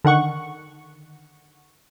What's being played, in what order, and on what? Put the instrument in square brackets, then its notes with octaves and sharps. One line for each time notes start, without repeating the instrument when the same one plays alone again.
[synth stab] D3 D#3 F#5 C#6